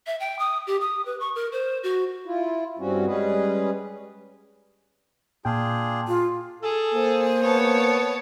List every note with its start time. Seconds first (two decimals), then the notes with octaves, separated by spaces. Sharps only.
0.07 E5
0.20 G5
0.39 D#6
0.67 G4
0.81 D#6
1.06 B4
1.20 C#6
1.35 A#4
1.52 C5
1.83 F#4
2.26 E4 F4
2.78 G2 G3 C4 C#4 F#4
3.06 G3 G#3 C#4 G#4 B4
5.45 A#2 D4 F4 G#4 G5
6.08 F4
6.63 G#4 A4
6.94 A#3 C5
7.42 B3 C#5 A5